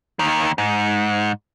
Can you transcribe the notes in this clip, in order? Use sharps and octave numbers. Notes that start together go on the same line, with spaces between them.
D#2 D#3
G#2